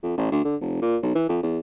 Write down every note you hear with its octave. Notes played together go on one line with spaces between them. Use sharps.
F2
A1
D2
D3
F1
A#2
B1
E3
F2
E2